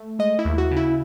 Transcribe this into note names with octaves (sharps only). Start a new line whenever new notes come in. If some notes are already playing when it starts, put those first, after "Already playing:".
Already playing: A3
G#3 D#5
E4
D#2
F#4
C#3
E4